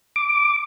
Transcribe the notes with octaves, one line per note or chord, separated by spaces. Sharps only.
D6